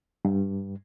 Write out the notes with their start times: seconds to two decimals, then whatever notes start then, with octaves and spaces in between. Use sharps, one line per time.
0.25 G2